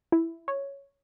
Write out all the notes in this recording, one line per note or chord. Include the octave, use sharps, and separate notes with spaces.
E4
C#5